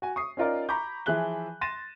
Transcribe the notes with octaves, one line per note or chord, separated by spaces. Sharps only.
F#4 G#5
C#6 D#6 C7
C#4 D#4 F4 A#4 D5
A#5 B5 C#6 D6 G6
E3 F3 G#4 E5 F#6 G7
C6 A6 A#6 D#7 E7